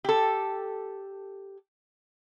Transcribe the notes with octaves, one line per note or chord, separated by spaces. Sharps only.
G4 A4